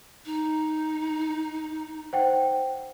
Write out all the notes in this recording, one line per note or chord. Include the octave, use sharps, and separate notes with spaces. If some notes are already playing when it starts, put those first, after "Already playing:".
D#4
C5 F#5 G5